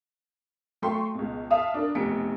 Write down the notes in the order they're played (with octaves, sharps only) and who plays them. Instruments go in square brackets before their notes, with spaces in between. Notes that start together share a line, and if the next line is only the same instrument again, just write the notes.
[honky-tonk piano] F#3 A3 G5 C6 C#6
C#2 B2
E5 F5 A5 D#6
D4 A#4
F1 E2 B2 B6 C#7 D7